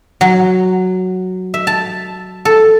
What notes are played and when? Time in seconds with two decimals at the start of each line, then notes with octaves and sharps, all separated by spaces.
0.21 F#3
1.54 E5
1.67 A5
2.45 A4